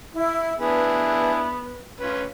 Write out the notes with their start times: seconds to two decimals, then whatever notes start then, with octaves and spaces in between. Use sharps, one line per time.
0.13 E4
0.59 B3 D4 E4 G#4 B4
2.00 C#4 F4 B4